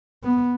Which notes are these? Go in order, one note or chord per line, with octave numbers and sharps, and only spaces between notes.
B3